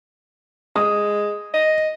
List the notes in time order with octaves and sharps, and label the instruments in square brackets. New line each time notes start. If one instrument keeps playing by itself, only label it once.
[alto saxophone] G#3 [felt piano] D#6
[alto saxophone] D#5